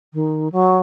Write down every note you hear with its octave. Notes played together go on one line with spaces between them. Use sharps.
D#3
F#3